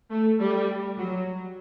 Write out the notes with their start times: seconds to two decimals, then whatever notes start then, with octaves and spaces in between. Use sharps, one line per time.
0.11 A3
0.40 G3
0.97 F#3